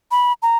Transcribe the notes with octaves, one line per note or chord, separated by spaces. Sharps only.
B5
A#5